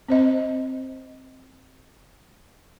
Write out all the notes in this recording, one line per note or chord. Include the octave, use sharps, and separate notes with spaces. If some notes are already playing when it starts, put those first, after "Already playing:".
C4 C5 D#5